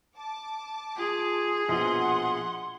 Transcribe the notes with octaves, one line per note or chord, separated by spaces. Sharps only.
A5 D6
F4 G#4
A#1 B2 F3 F#5 C6